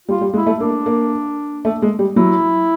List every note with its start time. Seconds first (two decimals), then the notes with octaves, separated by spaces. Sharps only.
0.08 G3 F4
0.21 G3
0.34 G#3 E4
0.46 A3
0.60 A#3 D4
0.86 A#3
1.65 A3
1.82 G#3
1.99 G3
2.16 F#3 E4